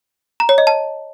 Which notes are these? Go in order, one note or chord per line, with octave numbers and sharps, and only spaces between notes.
A#5
C#5
D#5
A5